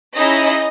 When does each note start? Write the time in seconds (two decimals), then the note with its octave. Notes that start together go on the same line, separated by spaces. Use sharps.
0.14 C#4 D#4 E4 G#4 D#5